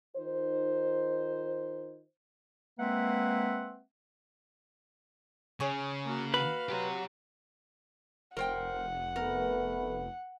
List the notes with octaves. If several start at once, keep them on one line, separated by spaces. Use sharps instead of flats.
D#3 D#4 F4 C5
G#3 A#3 C4 B4 E5 F#5
C#3 G#4 C#5
A#3 F#4
F#4 B4 F5 B5
F#3 G4 C6
F1 A#4 C5 F#5 G5
A3 B3 A#4 B4